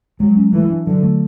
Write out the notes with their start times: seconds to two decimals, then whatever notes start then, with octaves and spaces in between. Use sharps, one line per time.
0.19 F#3 G#3
0.37 C#4
0.52 E3 A3
0.70 D4
0.86 D3 F#3
1.03 A3